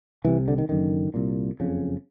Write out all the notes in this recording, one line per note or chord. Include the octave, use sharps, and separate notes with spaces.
C2 C3 E3
D3
D#3
F#1 F#2 D3 D#3
C2 A#2
F#1 F2 C#3